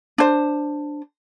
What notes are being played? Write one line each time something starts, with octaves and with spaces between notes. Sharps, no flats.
D4 C5